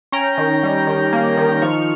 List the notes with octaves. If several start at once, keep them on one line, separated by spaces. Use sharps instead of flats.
C#4 G5 A#5
D#3
G3
D#3
A#3
D#3
F3 C#6 F6